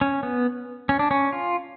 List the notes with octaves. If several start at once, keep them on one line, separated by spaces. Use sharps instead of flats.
C#4
B3
C#4
D4
C#4
F4